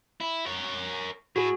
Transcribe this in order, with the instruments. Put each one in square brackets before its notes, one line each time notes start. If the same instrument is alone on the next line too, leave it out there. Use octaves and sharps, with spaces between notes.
[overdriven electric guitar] E4
A#4 C#5
[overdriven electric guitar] A2 [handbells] F#4 G#4